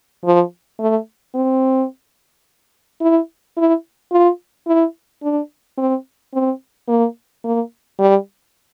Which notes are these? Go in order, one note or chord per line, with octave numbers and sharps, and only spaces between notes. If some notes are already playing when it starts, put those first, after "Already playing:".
F3
A3
C4
E4
E4
F4
E4
D4
C4
C4
A#3
A#3
G3